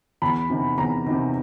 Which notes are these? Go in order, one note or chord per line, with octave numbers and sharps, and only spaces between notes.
E2 B5
C3 D#3
E2 A#5
C3 D#3